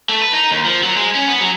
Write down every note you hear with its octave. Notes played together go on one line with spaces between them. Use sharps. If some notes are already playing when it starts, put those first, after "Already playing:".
A3
B4
D#4
D#2
F3
F#3
G#3
C#4
B3
F#3